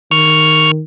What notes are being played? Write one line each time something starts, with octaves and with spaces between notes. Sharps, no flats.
D#3 C#6 F6